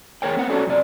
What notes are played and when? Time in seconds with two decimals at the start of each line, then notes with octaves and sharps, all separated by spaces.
0.22 E2 G#4 A#4 C#5 G5
0.37 B3 C4 F#5
0.50 C#4 D4 F#4 A4 C#5 D5
0.67 F#2 C3 D5